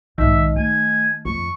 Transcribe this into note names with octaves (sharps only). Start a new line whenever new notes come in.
B1 G#2 D#3 E5
A3 G#5
F2 C#6